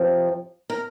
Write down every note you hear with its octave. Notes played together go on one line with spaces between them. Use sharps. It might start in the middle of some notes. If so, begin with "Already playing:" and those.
Already playing: F2 C3 F3
A#4